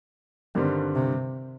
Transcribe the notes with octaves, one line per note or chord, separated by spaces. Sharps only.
G2 D3 D#3 G3 C4
C3